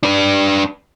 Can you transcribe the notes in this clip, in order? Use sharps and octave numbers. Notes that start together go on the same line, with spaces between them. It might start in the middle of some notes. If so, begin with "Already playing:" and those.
D4 B4